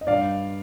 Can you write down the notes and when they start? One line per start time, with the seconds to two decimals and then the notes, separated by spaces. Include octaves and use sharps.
0.01 D#5
0.07 G2 D5 F5